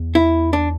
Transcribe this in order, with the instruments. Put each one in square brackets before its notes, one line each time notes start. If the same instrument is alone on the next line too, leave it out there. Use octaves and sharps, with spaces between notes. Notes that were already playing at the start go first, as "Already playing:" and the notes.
Already playing: [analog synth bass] E2
[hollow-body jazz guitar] E4
D4